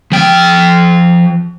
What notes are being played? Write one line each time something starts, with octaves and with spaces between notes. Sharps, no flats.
F3 G5